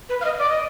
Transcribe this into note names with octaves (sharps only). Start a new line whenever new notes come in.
B4
F5
D#5
D5
D#5